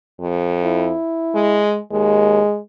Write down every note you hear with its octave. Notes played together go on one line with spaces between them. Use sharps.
F2
E4
G#3
D#2 G#3